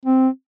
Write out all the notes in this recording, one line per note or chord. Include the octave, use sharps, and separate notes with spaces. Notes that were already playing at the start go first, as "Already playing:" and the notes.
C4